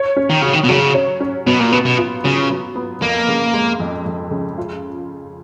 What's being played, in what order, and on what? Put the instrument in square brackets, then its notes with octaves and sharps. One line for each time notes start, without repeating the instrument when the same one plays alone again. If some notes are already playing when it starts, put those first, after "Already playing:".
Already playing: [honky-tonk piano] C#5
C#4
[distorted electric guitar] D#3
[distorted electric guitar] C#3 [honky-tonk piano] F#4
[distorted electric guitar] D#3
B2
[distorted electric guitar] C#3 [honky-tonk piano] F#3
[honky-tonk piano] C#5
C#4
[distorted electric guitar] B2 [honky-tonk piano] F#3
[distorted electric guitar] A#2
[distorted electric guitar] B2 [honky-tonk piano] B3
[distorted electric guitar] B2
[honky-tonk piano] F4
[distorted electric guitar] C#3 [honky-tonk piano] F#3
[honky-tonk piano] F#3
B3
[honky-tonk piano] F2 [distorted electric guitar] A#3
[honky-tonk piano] C#3
G#3
F2
F2
C#3
F4